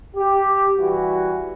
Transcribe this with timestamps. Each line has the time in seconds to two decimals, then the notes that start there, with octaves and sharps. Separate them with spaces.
0.15 G4
0.77 E3 G3 F#4